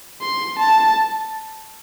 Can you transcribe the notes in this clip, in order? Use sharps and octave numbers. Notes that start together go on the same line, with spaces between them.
C6
A5